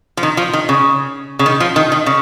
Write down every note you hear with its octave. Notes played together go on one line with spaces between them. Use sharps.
F3
D#3
F3
D#3
C#3
C#3
D#3
F3
D#3
D#3
C#3